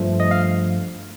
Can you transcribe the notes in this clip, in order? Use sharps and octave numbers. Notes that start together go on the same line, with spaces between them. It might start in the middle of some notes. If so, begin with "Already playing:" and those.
Already playing: G2 F3 A3
D#5
F5